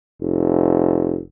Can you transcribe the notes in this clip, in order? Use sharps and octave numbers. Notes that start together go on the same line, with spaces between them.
F1